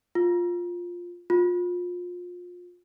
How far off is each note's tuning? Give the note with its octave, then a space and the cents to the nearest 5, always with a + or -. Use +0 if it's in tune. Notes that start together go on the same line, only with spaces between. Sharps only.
F4 +5
F4 +30